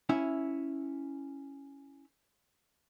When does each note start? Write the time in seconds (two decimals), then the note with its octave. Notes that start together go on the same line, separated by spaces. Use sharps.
0.09 C#4 E4 E5